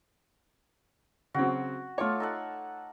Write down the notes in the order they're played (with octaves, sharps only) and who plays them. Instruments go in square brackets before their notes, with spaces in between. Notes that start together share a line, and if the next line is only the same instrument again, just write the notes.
[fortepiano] C#3 F#3 C4 [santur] F#4
[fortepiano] A3 C#5 [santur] F4 D6
[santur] D#4 A4 F#5